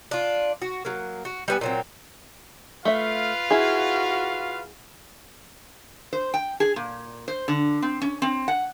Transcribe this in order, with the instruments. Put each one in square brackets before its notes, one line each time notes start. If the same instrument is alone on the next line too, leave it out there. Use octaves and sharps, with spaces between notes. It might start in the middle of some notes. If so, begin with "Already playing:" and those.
[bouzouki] D4 F4
F#4
F#3 A#3
F#4
G3 B3 G#5
A#2 F#3 C4
[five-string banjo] A3 E5 [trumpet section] F4 B4 F5
[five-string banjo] E4 G#4 [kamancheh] F#4
[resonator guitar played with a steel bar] C5
G5
G#4
A#2
C5
D3
C4
C#4
C4
F#5